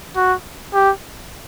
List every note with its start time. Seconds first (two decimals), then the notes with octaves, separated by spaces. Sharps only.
0.16 F#4
0.74 G4